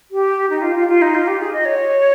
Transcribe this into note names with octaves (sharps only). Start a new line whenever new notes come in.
G4
D#4
F4
F4
F4
D#4
F4
G4
G#4
D#5
C#5